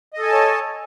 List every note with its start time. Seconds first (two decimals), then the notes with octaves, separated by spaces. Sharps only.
0.13 D#5
0.18 A4
0.23 G#5
0.27 A5
0.32 C#5